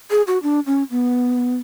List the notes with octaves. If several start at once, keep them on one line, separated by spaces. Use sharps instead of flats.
G#4
F#4
D4
C#4
B3